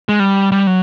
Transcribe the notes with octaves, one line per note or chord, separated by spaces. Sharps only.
G#3
G3
G3
F#3